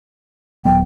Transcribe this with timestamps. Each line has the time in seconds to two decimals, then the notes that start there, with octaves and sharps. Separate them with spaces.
0.65 D#1 F#3 B3 G5